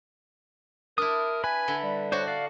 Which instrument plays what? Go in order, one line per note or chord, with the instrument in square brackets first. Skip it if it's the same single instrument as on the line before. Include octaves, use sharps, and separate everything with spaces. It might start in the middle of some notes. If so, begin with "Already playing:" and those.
[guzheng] D4 E4 [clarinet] A#4 [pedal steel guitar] D#6
[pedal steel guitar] B4 B5 [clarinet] G#5
[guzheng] D3 E4
[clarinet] G3
[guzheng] D4 F#4 [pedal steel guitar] C5 C#5
[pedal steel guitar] D5 F5